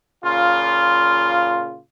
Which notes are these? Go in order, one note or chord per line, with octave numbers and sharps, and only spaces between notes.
A#2 C#3 F4